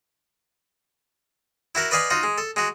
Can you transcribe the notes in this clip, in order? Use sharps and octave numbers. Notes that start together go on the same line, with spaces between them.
E4 F#4 A#4
B4 D5 D#5 F5 G#5 B5
D#4 F4 F#4
G#3
A4
G#3 F#4